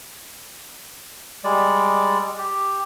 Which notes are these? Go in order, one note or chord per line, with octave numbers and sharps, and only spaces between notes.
G3 G#3 D5
G4